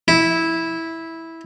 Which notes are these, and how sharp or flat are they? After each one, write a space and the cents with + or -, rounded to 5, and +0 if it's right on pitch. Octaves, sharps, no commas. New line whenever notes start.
E4 -10